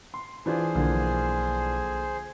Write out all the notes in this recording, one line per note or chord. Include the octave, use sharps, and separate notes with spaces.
C6
E3 D4 F4 G#4 C5
B1 D3 F3 A#3